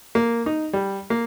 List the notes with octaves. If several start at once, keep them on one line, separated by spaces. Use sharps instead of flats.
A#3
D#4
G3
A#3